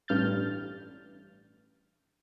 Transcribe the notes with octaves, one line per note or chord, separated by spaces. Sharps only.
A1 G2 F6 G6 A6